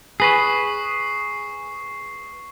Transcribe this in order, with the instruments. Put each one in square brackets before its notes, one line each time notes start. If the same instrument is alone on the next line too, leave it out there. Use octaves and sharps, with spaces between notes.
[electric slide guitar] G#4 B4 [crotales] C#6 A#6 C7